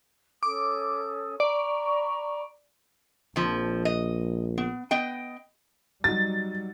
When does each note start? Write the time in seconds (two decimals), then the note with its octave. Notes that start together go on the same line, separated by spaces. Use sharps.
0.43 C#4 A4 D6 D#6
1.40 D5 A#5 B5 C#6
3.36 A#1 F2 F3
3.85 D#5
4.58 B3
4.91 B3 D#5 G5
6.04 F#3 G3 D#4 F#4 A6